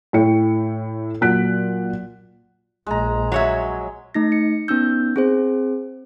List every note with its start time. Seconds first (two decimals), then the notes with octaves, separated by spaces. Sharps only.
0.13 A2 E4 C#5 G5 C#7
1.21 A#2 F#3 F4 F#6 B6 D7
2.87 A#1 G#3 A#5
3.32 F#3 C#5 E5
4.14 A3 D#4 A#6
4.32 C#7
4.68 B3 C#4 D#4 E6 G6
5.16 C4 G#4 C5